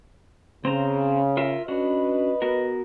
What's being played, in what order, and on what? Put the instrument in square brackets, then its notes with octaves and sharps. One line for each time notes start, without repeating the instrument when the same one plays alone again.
[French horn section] C#3 [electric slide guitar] C4 C5 A#5
[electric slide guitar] F4 A#4 E5
[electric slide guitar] C#4 D4 F#4 [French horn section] B4 D#5
[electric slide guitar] B3 F#4 A#4